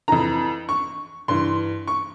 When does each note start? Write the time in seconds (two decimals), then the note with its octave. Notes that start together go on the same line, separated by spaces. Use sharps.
0.08 F2 E3 A#5
0.69 C#6
1.28 G2 E3 C6
1.88 C#6